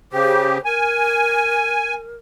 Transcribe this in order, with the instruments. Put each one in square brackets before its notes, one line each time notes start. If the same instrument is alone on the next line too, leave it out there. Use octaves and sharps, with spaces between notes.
[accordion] C#3 G4 [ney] C5
[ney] A#4 [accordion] G#5